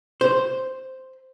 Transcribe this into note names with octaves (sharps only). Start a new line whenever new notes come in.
C5